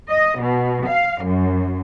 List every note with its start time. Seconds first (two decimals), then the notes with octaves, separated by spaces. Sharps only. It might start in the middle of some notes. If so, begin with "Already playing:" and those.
0.10 D#5
0.42 B2
0.87 F5
1.24 F#2